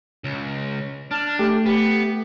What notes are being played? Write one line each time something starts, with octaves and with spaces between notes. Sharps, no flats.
C#2
D4 A5 F6
A3 G4
B3 G4